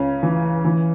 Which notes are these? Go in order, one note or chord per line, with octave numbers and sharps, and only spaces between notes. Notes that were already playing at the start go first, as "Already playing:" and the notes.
Already playing: C#2 C#3 C#4
E3
E3